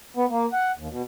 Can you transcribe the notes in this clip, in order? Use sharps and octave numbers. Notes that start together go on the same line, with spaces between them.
B3
A#3
F#5
D#2
B2